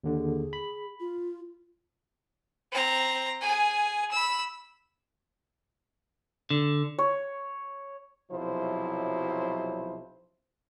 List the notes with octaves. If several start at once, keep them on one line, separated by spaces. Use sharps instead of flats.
D#2 D3
G#4
B5
F4
C4 A#5
G#4 G#5
B5 E6
D3
C#5
B1 C3 F3 F#3 E4 C5